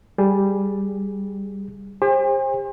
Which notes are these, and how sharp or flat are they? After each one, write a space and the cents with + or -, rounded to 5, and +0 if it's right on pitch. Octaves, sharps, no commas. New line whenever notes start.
G3 +0 G#4 +0
G4 +40 C5 +30 G#5 -45